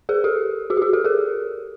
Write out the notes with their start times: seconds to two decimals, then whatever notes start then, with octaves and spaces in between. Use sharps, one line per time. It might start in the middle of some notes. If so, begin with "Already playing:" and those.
0.09 G#4 A#4
0.24 G4 A4
0.70 F#4 G#4
0.77 G4
0.82 F#4 G#4
0.93 G4 A4
1.05 G#4 A#4